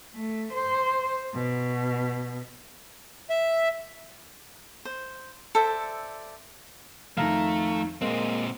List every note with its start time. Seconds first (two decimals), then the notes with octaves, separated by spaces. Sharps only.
0.15 A3
0.53 C5
1.34 B2
3.30 E5
4.85 C5
5.55 A4 C5 D5 E5
7.17 F2 D#3 A3 F5 A#5 A#6
8.02 A#2 G#3 A#3 C4